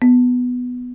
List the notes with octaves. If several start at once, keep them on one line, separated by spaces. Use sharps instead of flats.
B3